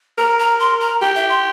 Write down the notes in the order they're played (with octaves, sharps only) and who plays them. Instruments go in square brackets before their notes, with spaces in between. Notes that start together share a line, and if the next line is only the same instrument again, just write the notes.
[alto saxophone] A#4 [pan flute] A#5
[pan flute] A#5
C6
A#5
[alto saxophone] G4 [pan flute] G5
[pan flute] E5
C6